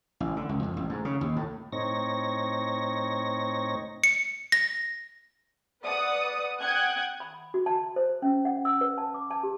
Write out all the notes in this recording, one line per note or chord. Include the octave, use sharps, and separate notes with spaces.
A1
D3
C#2
F2
A1
G#2
C#3
D#2
A2
A2 C4 D#4 C#5 A#6
C#7
A#6
B4 D5 F#5 D#6
F#5 G5 D#6 F#6 G#6
B5
F#4
A5
C5
C#4
F#5
E6
B4
A5
D6
A5
G4